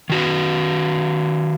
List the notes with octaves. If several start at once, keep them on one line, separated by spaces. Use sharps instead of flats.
D#3 F#4 B4